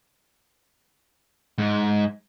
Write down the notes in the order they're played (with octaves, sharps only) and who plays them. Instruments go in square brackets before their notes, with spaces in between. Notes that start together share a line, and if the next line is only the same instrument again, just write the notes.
[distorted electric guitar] G#2